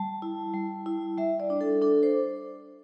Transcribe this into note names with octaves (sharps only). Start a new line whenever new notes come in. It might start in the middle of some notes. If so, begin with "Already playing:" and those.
Already playing: G3 A5
E4
G3
E4
G3 E5
D5
D4
A4
D4 A4
C5